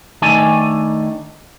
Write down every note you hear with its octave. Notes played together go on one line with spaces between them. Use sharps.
D#3 A3 D4 G#5